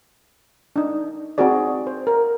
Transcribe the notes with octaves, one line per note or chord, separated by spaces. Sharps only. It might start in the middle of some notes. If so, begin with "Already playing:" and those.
D4 D#4
C4 D#4 F#4 G#4 D5
C5
A#4